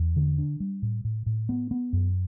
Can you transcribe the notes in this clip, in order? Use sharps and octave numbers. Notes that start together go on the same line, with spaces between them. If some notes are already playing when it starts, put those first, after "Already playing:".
Already playing: E2
D3
D4
G3
A2
A2
A2
B3
B3
F#2